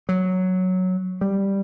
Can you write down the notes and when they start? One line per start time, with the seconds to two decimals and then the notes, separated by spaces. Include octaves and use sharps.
0.09 F#3
1.21 G3